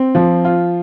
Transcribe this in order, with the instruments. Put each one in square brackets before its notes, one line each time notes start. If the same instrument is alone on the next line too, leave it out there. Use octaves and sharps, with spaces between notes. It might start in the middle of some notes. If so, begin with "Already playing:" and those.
Already playing: [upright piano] C4
F3
F4